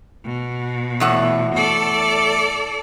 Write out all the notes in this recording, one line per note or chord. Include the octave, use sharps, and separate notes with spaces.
B2
E2 A2 F#5
A4 D5